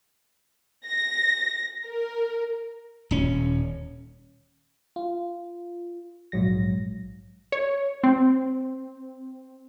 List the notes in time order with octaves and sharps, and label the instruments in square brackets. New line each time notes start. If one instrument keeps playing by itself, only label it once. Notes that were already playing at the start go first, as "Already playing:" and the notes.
[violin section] A#6
A#4
[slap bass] D#1 C#4
[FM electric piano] F4
A#1 G#2 F#3 A#6
[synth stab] C#5
C4